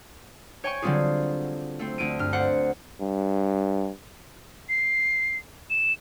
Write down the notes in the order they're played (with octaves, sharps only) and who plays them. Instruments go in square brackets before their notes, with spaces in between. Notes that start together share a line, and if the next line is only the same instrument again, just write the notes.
[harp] C#5 G5 G#5 C#6
D3 F#3 G3 C4 F4 G#4
A3 C4
D2 A3 D7 D#7
G2 F6
C5 D5 F#5
[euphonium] G2
[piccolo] C7
E7